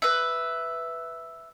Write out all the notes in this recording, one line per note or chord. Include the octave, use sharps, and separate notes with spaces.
B4 E5